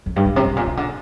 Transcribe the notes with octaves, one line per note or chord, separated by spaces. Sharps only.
F2
G2
G#2
C3
G#2
A#2
C3
D3